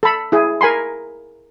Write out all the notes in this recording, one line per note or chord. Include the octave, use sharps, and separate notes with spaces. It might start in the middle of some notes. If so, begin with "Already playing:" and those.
A4 B5
E4 G#4
A#4 G#5 B5 C6